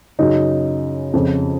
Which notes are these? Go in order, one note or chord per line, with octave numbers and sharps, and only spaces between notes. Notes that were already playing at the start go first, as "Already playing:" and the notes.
F#2 C#3 D#4
F2 C#3